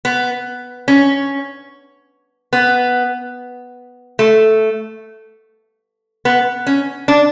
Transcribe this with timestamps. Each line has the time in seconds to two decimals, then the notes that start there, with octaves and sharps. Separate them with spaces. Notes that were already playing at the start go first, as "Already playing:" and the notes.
0.05 B3
0.88 C#4
2.53 B3
4.19 A3
6.25 B3
6.67 C#4
7.08 D4